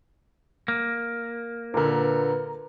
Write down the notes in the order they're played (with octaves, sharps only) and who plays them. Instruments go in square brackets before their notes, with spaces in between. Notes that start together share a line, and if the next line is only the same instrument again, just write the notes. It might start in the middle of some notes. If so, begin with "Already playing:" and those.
[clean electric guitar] A#3
[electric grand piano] A#2 D3 [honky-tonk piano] A#4 A#5 [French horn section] B4